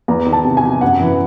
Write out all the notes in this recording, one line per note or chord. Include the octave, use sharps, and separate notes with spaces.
E2 A#5
D#3
A5
C3
G#5
C3
F#2 F#5
E3